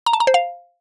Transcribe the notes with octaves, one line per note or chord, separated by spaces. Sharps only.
A#5
A5
A#5
C5
F5